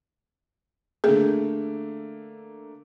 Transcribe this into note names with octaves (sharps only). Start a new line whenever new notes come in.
D3 A3 A#3 G#4